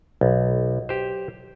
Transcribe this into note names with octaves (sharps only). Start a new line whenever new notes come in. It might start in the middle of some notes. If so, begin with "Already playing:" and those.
B1
G4 C5